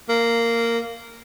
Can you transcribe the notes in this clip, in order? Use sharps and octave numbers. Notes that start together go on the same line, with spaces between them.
A#3